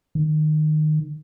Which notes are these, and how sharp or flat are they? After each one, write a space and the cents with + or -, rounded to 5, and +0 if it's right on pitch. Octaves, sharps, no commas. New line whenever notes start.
D#3 -20